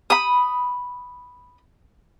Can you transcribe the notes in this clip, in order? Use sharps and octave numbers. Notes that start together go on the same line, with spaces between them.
B5 D#6